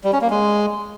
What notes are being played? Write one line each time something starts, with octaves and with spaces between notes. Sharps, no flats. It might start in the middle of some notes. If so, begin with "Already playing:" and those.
G3
C#4
A#3
G#3